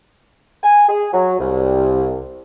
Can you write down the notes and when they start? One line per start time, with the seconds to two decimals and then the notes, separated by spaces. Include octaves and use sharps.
0.63 G#5
0.89 G#4
1.13 F#3
1.39 C2